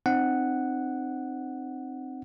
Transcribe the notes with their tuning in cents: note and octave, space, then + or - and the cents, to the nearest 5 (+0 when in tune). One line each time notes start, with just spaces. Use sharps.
C4 +0 D#4 -35 F#5 +0